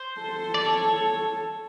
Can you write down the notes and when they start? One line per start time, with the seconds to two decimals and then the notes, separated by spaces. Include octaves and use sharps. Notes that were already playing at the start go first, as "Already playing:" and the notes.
Already playing: C5
0.21 A4
0.54 D5
0.65 C#5